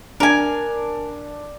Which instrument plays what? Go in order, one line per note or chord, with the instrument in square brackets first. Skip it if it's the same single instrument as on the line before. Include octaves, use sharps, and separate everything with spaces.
[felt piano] D4 [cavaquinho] A#4 G#5